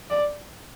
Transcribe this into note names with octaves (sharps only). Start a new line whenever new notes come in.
D5